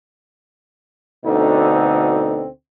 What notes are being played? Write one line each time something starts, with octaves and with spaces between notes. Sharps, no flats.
D2 B2 D3 C4 D#4